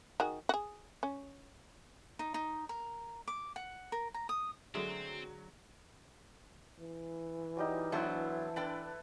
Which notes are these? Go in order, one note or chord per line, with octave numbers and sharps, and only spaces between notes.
D#3 F#4 G#4
F#4 G#4
C#4
D#4
D#4
A#4
D6
F#5
A#4
A#5
D#6
D3 F#3 G#3 A3 C4
E3
F#3 G3 D#4
F#3 B3 D4 E4 A4 C5
D4 A4 B4 D5 G5